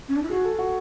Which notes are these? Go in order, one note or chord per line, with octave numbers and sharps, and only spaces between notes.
C#4
D4
E4
F#4 G#4
A4
F#4